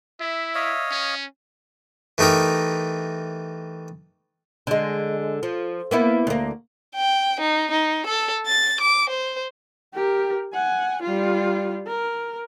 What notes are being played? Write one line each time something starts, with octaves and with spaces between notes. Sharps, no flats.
E4 E5
C#5 D#5 F5
C#4
E3 A3 D#4 G4 A#4
D3 G#3
F3
A#3 B3 E4
D2 A#3
G5
D#4
D#4
A4
A6
D6
C5
G4 A#4
F#5 G#5
G3 F4
A#4